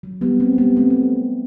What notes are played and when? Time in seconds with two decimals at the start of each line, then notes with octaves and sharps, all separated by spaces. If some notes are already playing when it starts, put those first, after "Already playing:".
0.03 F#3
0.21 G3 B3
0.40 A3 C4
0.58 G3 B3
0.76 A3 C4
0.90 C4